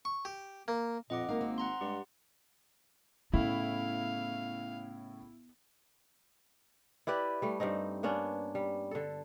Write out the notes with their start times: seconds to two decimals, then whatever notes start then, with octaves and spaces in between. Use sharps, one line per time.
0.05 C#6
0.25 G4
0.68 A#3
1.10 F2 A#2 D#5 F#5 D6
1.28 G#1 A#3 A#4 F5
1.41 C4
1.58 F#5 A#5 C6
1.81 G2 G#3 G4
3.33 A2 C#3 B3 C#4 E4 F5
7.07 E4 G4 B4 D5
7.42 G3 A3
7.60 G2 G3 C4 D#4
8.03 A#3 B3 C#4 D4
8.55 G3
8.91 D3 A4